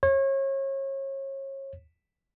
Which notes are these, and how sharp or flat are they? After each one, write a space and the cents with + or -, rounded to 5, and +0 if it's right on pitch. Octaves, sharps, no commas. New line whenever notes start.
C#5 -30